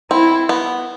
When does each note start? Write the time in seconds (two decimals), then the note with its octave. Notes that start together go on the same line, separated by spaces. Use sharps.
0.11 C4 E4
0.49 B3